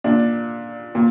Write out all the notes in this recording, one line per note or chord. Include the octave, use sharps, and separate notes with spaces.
A#2 D4
A#2